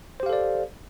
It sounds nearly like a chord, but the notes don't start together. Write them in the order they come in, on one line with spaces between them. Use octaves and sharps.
C5 G4 F5 A4 D5